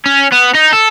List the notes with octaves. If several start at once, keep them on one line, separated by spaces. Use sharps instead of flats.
C#4
B3
D#4
A4